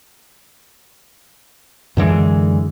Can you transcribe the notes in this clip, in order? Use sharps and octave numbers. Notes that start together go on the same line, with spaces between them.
F#2 D3 E3 G#3